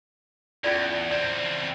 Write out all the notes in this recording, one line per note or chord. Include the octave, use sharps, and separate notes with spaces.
E2 C#4 F4 D5
E2 C4 D5